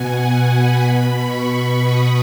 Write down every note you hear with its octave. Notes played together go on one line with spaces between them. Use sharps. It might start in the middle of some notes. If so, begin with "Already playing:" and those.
Already playing: B2 F#5 G#5
G#5
B5
B2 B5
C#6
C#6
D#6